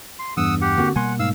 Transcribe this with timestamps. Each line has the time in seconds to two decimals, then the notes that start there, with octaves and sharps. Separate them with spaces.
0.19 C6
0.37 E2 G2 F#5 D#6 E6
0.61 G4 F#5
0.78 D3 A#3 C4 F#4
0.96 B2 G3 A#3 F#5 G#5 C6
1.19 G#2 F5 E6